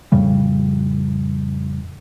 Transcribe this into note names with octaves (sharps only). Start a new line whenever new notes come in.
F2 A2 C#3 G3